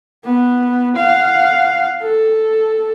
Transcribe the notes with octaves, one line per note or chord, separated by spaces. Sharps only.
B3
F5 F#5
A4